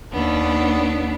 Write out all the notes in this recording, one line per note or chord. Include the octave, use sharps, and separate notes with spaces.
D#2 B3 D4